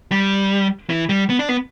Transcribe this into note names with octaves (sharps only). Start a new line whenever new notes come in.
G3
E3
G3
B3
D4
B3